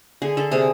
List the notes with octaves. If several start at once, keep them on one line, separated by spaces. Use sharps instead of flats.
D3 G#4
D3 A4
C3 G#4